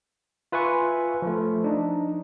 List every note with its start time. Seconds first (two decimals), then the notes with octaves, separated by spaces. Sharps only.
0.52 F4 B4 E5 G#5 C#6
1.22 F3 A3
1.64 D4 D#4